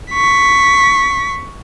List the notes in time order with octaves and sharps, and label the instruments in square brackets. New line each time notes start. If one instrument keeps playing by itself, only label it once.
[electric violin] C#6 B6